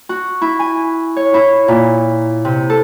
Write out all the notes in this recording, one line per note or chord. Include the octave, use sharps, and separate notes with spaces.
F#4
E4
G#5
C#5
E4
A#2
C3
A4